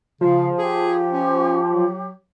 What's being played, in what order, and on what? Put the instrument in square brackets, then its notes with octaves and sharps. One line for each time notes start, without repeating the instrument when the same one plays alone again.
[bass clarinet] C#3 [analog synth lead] F3 [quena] F5
[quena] G4 [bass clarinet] G#4
[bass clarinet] C#4
F#3